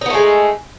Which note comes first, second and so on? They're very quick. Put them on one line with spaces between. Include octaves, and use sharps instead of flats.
D#4 B3 A3 G#3